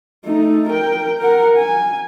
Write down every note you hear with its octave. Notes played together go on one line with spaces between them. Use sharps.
A3 D#4
A#4 G5
A#4 F#5
G#5